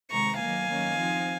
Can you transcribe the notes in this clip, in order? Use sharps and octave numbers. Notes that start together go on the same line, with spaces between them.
C3 D#3 G#3 A#5 C#6
D#3 F#3 A#3 F5 G#5
D#3 F#3 A#3 C#4
F3 C4 D#4